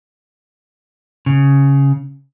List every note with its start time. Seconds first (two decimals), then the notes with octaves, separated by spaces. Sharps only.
1.26 C#3